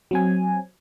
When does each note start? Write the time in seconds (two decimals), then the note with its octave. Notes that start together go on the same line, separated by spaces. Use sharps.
0.11 F#3 C4 G#5